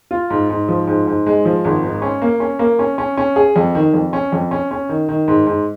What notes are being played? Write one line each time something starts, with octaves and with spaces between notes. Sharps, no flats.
F4
G#2
G#2
F3
G#2
G#2
G#3
F3
G#1
G#2
C#4
A#3
C#4
A#3
C#4
C#4
C#4
G#4
F2
D#3
F2
C#4
F2
C#4
C#4
D#3
D#3
G#2
G#2